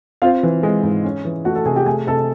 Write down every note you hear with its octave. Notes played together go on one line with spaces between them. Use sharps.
C4 F4 F5
E3
G#3
G#2
C#4
E3
A3 F#4 F#5
A4 A5
C3 G#4 G#5
G4 G5
A3 G#4 G#5
C3 A4 A5